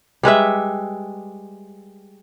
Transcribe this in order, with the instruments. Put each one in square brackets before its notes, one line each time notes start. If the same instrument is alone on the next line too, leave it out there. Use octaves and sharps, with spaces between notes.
[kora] G3 G#3 B4 E5